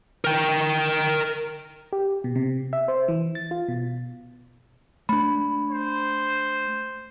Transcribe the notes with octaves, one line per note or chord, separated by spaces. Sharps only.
A#4 G5
G4
B2
C3
E5
C5
E3
A6
F4
B2
A3 D4 B5
C5